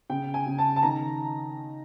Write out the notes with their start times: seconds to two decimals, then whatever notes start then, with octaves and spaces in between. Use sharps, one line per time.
0.10 C#3 G5
0.34 G#5
0.46 C#3
0.58 A5
0.76 A5
0.83 D#3 A#5